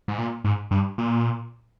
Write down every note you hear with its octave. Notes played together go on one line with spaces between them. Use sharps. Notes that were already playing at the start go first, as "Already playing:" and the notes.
G#2
A#2
G#2
G2
A#2